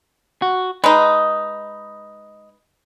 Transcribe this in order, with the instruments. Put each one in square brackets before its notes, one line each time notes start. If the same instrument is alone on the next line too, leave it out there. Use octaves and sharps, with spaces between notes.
[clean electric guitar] F#4
[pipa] G#3 D#4 [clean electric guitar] B4